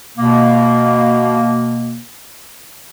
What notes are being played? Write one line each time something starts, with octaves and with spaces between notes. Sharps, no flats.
B2 A#3